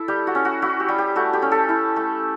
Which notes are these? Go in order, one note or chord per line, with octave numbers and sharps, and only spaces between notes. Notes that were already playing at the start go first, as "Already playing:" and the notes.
Already playing: E4 A4
G3 G4
F#4
C#4
F#4
E4 F#4
G4
G3
G4
A3 F#4
G4
C#4
A4
E4
A3